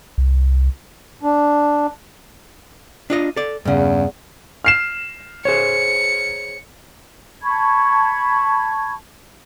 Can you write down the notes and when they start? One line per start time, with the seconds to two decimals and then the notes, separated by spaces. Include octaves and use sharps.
0.18 C2
1.23 D4
3.10 D4 F4 D#5
3.36 A4 D5
3.65 E2 G2 C#3
4.65 F6 C7 E7
5.45 G#4 C5 C#5 C#7
7.43 A5 B5 C#6 G#6